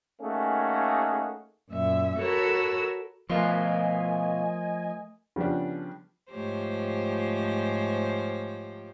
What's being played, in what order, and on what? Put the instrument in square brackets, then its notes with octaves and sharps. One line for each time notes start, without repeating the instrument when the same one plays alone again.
[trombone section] A3 A#3 C#4 D#4 F#4 G#4
[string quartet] F#2 A#2 E5
F#4 A4 A#4 C#5 B5 E6
[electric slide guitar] B2 F4 [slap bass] F3 [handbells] A3 A#4 C6 [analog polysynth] D#5 G#5
[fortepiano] C#3 F3 G3 B3 D4
[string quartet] G#2 F3 A3 G4 C5 C#5